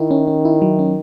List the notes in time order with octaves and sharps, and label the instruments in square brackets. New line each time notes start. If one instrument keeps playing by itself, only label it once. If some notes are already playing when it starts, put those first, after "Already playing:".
Already playing: [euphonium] D#3 [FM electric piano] E4
[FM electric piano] C#4
C#4
E4
F#3
C#4